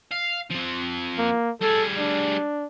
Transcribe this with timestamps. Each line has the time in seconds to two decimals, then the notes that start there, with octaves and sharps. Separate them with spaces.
0.11 F5
0.50 F3 C4
1.18 A#3
1.62 G3 G#4 A4
1.99 D4